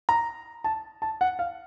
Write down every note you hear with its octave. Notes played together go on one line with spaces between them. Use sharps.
A#5
A5
A5
F#5
F5